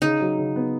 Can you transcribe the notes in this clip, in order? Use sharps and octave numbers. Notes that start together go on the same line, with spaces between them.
C#3 D#4
F#3
C#3
B3